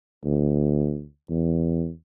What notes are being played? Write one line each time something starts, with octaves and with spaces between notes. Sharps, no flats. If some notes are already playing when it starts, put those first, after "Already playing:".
D2
E2